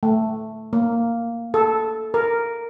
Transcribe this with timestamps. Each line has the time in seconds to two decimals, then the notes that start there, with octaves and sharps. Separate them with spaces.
0.03 A3
0.73 A#3
1.54 A4
2.14 A#4